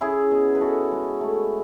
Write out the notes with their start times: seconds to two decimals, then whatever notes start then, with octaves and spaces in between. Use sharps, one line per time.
0.01 C#4 E4 G#4
0.31 B2
0.55 B4
0.60 B2 F#4 A4
0.92 G#3
1.21 A3